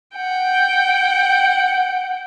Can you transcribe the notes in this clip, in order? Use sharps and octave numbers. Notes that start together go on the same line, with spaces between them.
F#5 G5